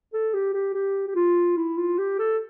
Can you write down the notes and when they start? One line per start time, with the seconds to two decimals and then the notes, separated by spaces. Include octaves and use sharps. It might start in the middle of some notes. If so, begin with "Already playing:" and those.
0.13 A4
0.34 G4
0.54 G4
0.74 G4
1.07 G4
1.15 F4
1.57 E4
1.78 F4
1.98 G4
2.19 A4